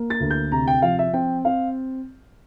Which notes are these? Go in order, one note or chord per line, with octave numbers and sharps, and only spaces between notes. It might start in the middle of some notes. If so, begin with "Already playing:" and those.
Already playing: A#3
A6
D2
G6
C3 A#5
G5
F3 F5
E5
C4 G5
C4 F5